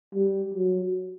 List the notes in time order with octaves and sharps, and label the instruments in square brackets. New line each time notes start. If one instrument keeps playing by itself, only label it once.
[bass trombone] G3
F#3